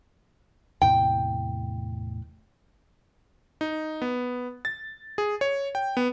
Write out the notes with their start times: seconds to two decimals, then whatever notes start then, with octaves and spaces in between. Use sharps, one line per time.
0.82 E2 A2 C3 G5
3.61 D#4
4.02 B3
4.65 A6
5.18 G#4
5.41 C#5
5.75 G5
5.97 B3